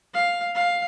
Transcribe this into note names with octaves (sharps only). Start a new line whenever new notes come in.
F5
F5